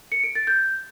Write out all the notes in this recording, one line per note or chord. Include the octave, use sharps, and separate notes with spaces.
C#7
D7
A6
G6